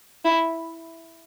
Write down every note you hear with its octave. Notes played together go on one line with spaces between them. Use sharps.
E4